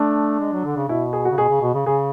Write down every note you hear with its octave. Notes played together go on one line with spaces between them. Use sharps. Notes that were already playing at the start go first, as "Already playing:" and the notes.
Already playing: A3 D4
G#3
F#3
D3
C#3
B2 E4
G#4
F#4
C#3
B2 G#4
C#3
B2
C#3
C#3 G#4